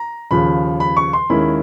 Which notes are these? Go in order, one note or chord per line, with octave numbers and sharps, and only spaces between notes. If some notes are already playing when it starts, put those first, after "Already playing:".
Already playing: A#5
D#2 C#3 F3 B5
B5
C#6
C6
D#2 D#3 G#3 C#4 E4 B5